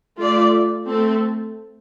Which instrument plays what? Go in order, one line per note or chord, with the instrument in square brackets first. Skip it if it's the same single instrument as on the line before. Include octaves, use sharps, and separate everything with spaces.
[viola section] A3 F4 D5
A3 C4 A4